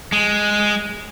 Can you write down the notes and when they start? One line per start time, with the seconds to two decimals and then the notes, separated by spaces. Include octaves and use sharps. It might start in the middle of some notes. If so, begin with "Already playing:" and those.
0.12 G#3